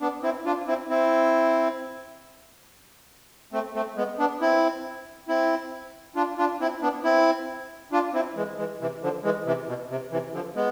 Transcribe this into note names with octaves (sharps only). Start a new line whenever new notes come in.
B3 D4
C4 E4
D4 F4
C4 E4
C4 E4
A3 C4
A3 C4
G#3 B3
B3 D4
C4 E4
C4 E4
D4 F4
D4 F4
C4 E4
B3 D4
C4 E4
D4 F4
C4 E4
E3 G#3
E3 G#3
C3 E3
D3 F3
E3 G#3
C3 E3
B2
C3
C3 E3
D3 F3
G#3 B3